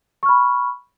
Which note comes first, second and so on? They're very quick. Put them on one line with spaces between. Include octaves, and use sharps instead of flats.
C#6 F6 B5